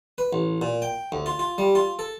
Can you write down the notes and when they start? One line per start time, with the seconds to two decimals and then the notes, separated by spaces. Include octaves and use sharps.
0.18 B4
0.33 A1
0.62 A#2
0.82 G5
1.12 D2
1.26 F4
1.39 F4
1.58 G3
1.75 F4
1.99 A4